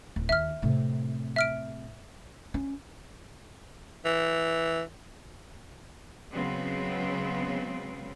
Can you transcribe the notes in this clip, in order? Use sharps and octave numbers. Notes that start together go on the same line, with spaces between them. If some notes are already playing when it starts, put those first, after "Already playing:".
D1
D#2 E5 F6
A2 C3
E5 F6 D7
C#4
E3
C#3 F#3 G#3 B3 C4